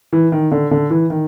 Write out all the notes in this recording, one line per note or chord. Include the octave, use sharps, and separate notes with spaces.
E3
D#3
D3
D3
E3
D#3